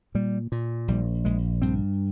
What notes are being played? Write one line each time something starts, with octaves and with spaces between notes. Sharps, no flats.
A#2 G3
A#2
A#1 G3
A#1 G#3
G2 C4